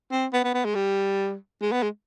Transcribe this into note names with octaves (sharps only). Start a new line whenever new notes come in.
C4
B3
B3
B3
G#3
G3
G#3
B3
G#3